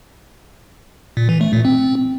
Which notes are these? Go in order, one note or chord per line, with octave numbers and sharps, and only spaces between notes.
A#2
E3
A3
A#2
C4